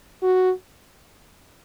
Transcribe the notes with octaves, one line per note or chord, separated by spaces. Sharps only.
F#4